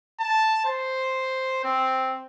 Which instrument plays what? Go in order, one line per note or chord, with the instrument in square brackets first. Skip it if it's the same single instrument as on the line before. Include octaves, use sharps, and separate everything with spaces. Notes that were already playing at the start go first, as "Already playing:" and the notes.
[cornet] A5
C5
C4